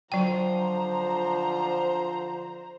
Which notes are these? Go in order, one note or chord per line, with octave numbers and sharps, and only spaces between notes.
D3 F3 F#3 C5 G5 A#5